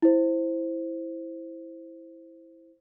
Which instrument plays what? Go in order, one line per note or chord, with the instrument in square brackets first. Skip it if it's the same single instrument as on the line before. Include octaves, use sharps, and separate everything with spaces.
[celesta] E4 C5